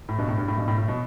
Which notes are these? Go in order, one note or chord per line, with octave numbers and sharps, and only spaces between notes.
A2
G2 B2
A2
G2
A2
G2 B2
A2
A2
B2